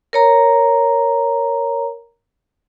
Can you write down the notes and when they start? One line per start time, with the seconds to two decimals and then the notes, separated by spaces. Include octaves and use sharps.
0.13 A#4 C#5 A#5